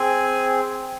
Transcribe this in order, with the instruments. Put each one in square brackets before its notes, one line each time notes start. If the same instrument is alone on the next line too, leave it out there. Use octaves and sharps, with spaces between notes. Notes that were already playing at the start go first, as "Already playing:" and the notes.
Already playing: [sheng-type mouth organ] C4 G#4 G#5